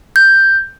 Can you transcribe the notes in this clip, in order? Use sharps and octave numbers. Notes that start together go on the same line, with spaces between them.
G6